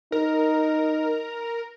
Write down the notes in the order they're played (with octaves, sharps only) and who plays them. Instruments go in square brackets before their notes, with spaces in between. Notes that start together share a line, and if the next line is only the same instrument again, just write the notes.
[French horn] D#4 [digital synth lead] A#4